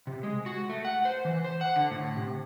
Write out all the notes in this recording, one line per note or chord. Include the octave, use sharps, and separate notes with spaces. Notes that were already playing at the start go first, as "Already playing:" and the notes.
C3
G#3
F#4
A3
F#5
C5
E3
C5
F#5
D3
A2
C3